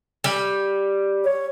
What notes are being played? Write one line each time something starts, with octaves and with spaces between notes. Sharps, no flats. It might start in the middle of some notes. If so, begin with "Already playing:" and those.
G3
C#5